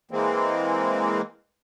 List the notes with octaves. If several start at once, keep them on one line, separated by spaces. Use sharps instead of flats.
E3 G#3 A#3 C4